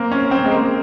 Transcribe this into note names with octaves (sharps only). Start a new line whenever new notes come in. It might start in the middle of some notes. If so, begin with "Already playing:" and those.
Already playing: A#3 C4
C#4
C4
G#3
A#3